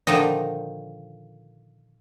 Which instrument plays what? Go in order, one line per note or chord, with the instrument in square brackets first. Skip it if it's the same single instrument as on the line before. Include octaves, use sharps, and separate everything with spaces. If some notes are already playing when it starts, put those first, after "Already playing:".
[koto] A#2 D3 D#3 F3 D#4